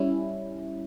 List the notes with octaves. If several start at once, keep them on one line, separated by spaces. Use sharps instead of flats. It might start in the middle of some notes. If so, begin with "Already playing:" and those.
Already playing: G3 C#4 E4